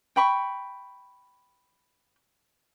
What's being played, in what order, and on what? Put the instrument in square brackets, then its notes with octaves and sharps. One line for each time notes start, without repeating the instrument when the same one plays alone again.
[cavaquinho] G5 B5 C#6